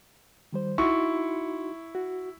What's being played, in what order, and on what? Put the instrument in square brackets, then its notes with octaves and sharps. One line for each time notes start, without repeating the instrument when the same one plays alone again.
[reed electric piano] D#3 G3 C5
[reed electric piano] D#4 F#4 C6 [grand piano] E4 C#6
[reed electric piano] F#4